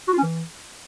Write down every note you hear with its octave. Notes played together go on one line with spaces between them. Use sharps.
F#4
F4
C#4
E3